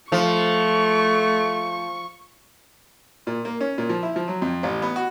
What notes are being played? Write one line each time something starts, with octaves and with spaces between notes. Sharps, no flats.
F3 A3 C#6
A#2
A#3
C#4
A#2
F3
E4
F3
F#3
F2
A1
B3
F#4